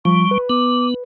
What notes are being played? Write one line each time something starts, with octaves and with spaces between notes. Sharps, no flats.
F3 G3 C#6
B4
B3 D6